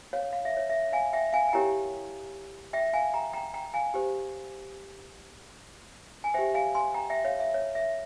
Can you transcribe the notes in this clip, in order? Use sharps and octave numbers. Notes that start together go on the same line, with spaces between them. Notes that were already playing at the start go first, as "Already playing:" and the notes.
C#5 F5
F5
E5
C#5
E5
F5 G#5
E5 G5
F5 G#5
G#5
E4 G4 A#4 C#5 G5 A#5
E5 G5
F5 G#5
G5 A#5
G5 A#5
G5 A#5
F5 G#5
G4 C5
G#5
G4 C5 E5 G5
F5 G#5
G#5 C6
G5 A#5
E5 G5
C#5 F5
E5
C#5
E5